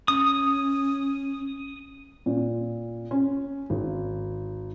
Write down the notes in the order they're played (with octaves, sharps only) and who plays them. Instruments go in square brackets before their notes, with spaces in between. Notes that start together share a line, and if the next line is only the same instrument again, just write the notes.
[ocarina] C#4 [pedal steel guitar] D#6
[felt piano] A#2
C#4
G#1